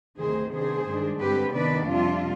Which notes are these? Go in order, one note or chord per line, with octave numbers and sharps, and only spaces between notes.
D2 C3 D#3 G#4 C5
C3 D#3 B3 D4 G#4 C5
G2 D#3 G#3 D4
G2 D3 G#3 C4 G4 B4
C3 D#3 B3 D4 B4 D5
F2 C3 G3 D4 F4